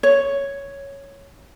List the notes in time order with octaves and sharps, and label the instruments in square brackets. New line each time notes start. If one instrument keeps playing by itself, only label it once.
[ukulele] C#5